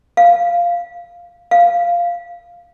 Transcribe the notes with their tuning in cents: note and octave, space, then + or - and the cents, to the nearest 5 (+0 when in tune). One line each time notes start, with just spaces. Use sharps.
F5 -5
F5 -5